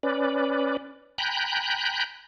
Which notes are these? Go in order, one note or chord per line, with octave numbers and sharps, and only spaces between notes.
C#4 B4 D5
G5 G#5 A#5 B5 F#6 G6